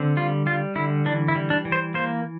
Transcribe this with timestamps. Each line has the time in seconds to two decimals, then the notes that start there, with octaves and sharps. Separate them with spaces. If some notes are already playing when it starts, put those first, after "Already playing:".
Already playing: D3 C4
0.17 G3 F4
0.46 G3 F4
0.75 D3 E4
1.05 E3 D4
1.28 E4
1.35 G3
1.50 D4
1.65 E3
1.72 C5
1.94 A#3 C5